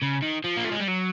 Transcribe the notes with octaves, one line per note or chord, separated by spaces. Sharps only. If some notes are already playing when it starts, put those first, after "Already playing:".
C#3
D#3
F3
A#3
A3
G#3
G3
F#3